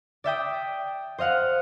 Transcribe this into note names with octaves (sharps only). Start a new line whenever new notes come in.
D5 E5 G5 D#6
C5 D#5 F5 F#5